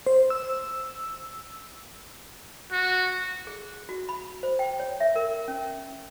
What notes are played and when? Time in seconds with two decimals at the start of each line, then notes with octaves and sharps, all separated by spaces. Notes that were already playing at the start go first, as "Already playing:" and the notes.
0.07 C5
0.30 E6
2.72 F#4
3.47 G#4
3.89 F#4
4.09 B5
4.43 C5
4.59 G5
4.80 C#5
5.00 E5
5.16 A#4
5.48 C#4